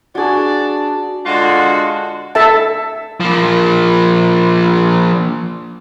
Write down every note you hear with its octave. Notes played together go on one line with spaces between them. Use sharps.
D4 F#4 G#4
D3 G#3 D4 F4 F#4
A4 E5 A5
F3 A#3